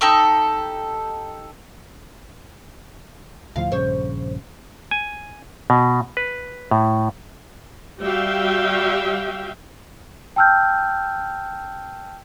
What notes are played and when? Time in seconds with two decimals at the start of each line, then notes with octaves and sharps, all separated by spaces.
0.01 D#4 G4 A4 C#6
3.56 D2 A2 F3 F5
3.72 A#1 G2 C#3 C5 C#5
4.91 G#5
5.70 B2
6.17 B4
6.71 A2
8.00 G3 F#4 G4 E5 F5 G5
10.36 G5 A5 E6 F6 G6